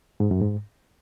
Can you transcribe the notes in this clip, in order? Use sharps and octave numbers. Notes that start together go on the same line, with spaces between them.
G#2
F#2
G#2